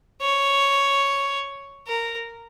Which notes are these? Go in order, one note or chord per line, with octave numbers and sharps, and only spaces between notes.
C#5
A#4